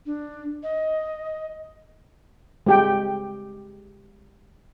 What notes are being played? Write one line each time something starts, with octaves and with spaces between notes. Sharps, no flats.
D4
D#5
G#3 G4 G5